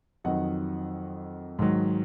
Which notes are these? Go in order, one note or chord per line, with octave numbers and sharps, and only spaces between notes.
F2 D#3 F#3 D#5 F#5
G#2 D#3 F#3